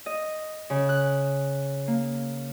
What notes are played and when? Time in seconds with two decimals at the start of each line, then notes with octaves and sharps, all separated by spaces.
0.06 D#5
0.70 C#3
0.89 F#6
1.88 A#3